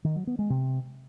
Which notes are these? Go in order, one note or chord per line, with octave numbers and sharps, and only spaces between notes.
D#3
F#3
B3
G#3
C3